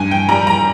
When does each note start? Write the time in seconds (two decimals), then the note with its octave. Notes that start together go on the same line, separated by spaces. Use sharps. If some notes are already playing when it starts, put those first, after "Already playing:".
Already playing: G2 G#5
0.11 G5
0.29 G3 A#5
0.47 A#5